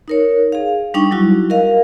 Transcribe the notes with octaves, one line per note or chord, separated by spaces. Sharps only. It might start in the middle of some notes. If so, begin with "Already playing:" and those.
D#4 A#4 C#5
G#4 F5
G3 D4 D#4 G5 C#6
F#3 G3 E4 F#4
A#4 D#5 F5